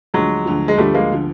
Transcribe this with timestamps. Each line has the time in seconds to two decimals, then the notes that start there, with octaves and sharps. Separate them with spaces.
0.14 D2 D3 F3 F#3 G#3
0.46 D2 D3 F3
0.68 G#3
0.78 D2 D3 F3 G3 A3
0.94 G#3 A#3
1.12 D3 F3